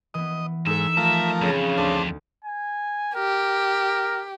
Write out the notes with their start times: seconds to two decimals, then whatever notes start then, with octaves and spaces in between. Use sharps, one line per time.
0.14 E3 B3 D#5
0.67 G#2 D#4 A4 E5
0.97 F3 A3 A#4
1.42 F2 C#3 B5 F6
1.78 D2 D4 C5 A5
2.44 G#5
3.15 G4 A#4